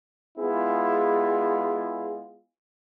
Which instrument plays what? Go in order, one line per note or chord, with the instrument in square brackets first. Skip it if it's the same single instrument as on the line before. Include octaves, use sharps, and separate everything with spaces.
[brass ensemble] G#3 B3 E4 F4 G#4